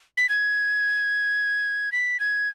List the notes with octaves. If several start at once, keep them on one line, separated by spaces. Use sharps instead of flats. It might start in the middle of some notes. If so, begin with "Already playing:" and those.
B6
G#6
B6
G#6